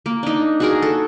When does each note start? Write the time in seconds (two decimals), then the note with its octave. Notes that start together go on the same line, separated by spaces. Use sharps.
0.06 A#3
0.23 D4 D#4
0.60 F#4 G#4 A#4
0.82 A4